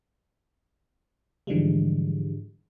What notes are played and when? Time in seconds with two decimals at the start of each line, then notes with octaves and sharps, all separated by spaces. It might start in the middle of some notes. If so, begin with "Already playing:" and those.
1.47 G#2 D3 E3 F3 G3 G#3